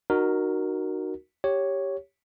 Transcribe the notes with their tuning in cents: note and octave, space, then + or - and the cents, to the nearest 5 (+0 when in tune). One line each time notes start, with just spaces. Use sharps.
D#4 -30 F#4 +0 A#4 +0
G4 +0 C#5 +0